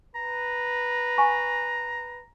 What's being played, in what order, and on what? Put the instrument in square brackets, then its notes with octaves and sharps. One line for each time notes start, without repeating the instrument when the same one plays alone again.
[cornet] B4 [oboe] A#5
[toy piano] G#5 C#6